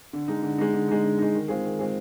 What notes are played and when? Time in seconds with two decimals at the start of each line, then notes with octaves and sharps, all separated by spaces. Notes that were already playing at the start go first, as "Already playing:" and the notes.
0.13 D3
0.28 G#3 D#4
0.43 D3
0.58 G#3 D#4
0.73 D3
0.88 G#3 D#4
1.03 D3
1.18 G#3 D#4
1.34 D#3
1.48 G#3 C4 F4 G#4
1.64 D#3
1.79 G#3 C4 F4 G#4